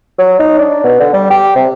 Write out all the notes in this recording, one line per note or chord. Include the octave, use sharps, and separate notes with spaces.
F#3
D#4
D4
B2
D3
G3
G4
C3